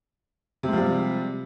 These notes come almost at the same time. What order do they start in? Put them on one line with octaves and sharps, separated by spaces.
C3 G#3 F3 G3